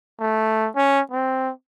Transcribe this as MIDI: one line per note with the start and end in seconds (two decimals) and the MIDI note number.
0.20 0.70 57
0.76 1.01 61
1.12 1.51 60